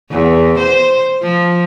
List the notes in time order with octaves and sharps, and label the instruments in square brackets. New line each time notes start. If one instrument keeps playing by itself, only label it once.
[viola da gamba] E2
C5
F3